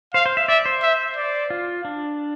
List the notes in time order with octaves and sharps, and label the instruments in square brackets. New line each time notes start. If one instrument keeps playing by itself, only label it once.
[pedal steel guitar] C5 [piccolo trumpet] F5
[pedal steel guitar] C5
E5
[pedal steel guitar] D5 [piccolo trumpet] E5
[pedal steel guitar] C5
[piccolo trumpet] E5
D5
[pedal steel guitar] F4
D4